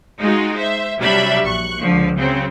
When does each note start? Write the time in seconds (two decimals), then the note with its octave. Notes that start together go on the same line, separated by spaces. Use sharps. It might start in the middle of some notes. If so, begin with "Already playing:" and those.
0.20 G#3 D#4 F4 F#4
0.56 C5 E5
0.99 C3 F#3 G3 D4 E5 B5
1.43 A#1 C#6 F#6
1.81 C#2 D3 F3
2.18 C#3 F#3 C4